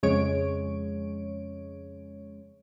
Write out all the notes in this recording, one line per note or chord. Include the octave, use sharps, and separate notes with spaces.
F2 C#3 G#3 C#5 D7